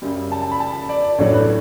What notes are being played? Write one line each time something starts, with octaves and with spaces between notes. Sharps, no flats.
F#2 C#3 G3
A5
A5
B5
A5
D5
A1 A2 F#3 A3 D4 C#5
B4